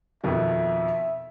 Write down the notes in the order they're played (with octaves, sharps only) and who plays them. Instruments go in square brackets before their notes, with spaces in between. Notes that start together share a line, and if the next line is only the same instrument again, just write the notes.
[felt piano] F2 B2 D#3 [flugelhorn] E5